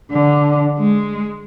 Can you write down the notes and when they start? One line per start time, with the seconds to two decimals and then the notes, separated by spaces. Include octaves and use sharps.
0.12 D3
0.78 G#3